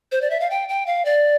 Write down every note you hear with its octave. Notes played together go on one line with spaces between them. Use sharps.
C5
D5
E5
F5
G5
G5
F5
D5